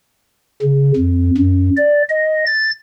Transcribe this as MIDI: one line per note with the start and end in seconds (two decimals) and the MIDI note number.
0.62 0.92 49
0.96 1.30 41
1.38 1.70 42
1.77 2.02 74
2.09 2.44 75
2.46 2.71 93